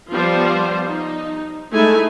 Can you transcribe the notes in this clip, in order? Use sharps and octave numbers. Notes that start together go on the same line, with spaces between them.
F3 G3 B3 F4 C5
D#4
G#3 A3 D#4 E4 G#5